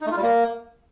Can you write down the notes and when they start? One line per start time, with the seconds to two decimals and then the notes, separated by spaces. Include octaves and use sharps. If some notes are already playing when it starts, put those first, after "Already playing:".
0.01 D#4
0.06 A3
0.11 F4
0.17 G3
0.22 A#3